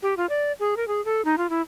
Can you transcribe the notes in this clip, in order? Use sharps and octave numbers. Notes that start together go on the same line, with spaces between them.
G4
F4
D5
G#4
A#4
G#4
A4
D#4
F4
E4